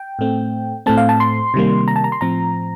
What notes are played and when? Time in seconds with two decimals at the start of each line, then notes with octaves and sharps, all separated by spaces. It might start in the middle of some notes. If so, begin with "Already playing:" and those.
Already playing: G5
0.19 A2 A3 C4
0.86 A2 A3 C4 A5
0.97 F5
1.09 A5
1.20 C6
1.54 C3 D#3 G3 A#3
1.88 A#5
1.96 A5
2.04 A#5
2.12 C6
2.21 A2 F3 C4 A#5